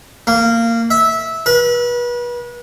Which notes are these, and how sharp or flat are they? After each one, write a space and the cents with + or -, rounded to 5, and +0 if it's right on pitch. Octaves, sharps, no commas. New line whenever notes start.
A#3 -20
E5 -15
B4 -35